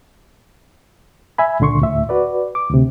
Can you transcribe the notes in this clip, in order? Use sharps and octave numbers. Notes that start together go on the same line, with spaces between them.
E5 G#5 B5
C#2 A#2 D3 C6 C#6
D2 A2 E5
F#4 B4 D5
D6
D2 C3